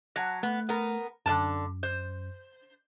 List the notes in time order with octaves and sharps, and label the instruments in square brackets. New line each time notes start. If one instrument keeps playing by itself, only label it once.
[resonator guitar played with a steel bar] F#3 [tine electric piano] F#5 A5 A#6
[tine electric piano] A3 [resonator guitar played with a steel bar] B3
[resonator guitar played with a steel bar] B3 A#4
[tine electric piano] F#2 [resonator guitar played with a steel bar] D3 A#4 A5
[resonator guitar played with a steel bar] C5